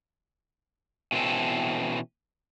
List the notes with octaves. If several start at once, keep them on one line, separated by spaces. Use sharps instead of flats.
B2 E3 C4 C#4 A4